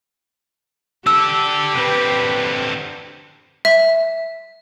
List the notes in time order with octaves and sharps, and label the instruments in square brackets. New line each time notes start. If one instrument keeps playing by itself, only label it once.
[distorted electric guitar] D4 A4 [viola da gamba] G4 [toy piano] E6
[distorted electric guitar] D3 C4 [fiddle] B4
[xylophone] E5